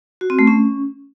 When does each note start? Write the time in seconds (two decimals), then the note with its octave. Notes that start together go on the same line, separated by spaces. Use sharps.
0.21 F#4
0.30 C4
0.39 A3
0.47 C#4